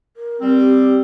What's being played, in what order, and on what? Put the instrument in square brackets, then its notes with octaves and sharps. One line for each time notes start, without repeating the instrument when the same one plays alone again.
[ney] A#4
[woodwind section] G3 C4
[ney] G4